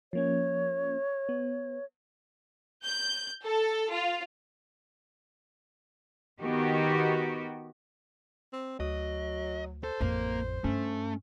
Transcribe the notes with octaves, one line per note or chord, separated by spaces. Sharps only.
F3 A#3 C#4 C#5
B3
G6
A4
F4
D#3 B3 F#4 G4
C4
D2 F#3 D#5
A4 C5
A1 F2 A#3
G2 A3 C#4